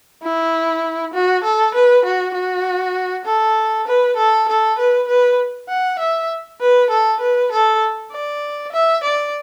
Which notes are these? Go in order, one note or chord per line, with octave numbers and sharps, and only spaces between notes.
E4
F#4
A4
B4
F#4
F#4
A4
B4
A4
A4
B4
B4
F#5
E5
B4
A4
B4
A4
D5
E5
D5